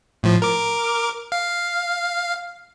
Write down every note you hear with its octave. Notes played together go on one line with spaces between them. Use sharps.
A2 F3
A#4 D6
F5